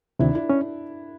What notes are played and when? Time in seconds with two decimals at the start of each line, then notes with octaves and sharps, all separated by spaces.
0.19 D2 C3 D#3 D4 E4
0.35 D4 E4
0.49 C#4